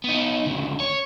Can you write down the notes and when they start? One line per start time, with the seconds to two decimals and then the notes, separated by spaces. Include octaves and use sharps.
0.04 B3 D#4
0.46 D2 C#3
0.80 C#5